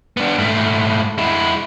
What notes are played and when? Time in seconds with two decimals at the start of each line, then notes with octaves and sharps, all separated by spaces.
0.17 B3 D4
0.39 G#2 A3
1.18 G#3 E4